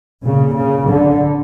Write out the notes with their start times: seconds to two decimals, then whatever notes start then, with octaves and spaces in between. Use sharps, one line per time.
0.24 A#2 C#3
0.56 C#3
0.88 D3